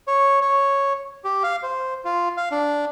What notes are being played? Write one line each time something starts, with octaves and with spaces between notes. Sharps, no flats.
C#5
C#5
G4
F5
C5
F4
F5
D4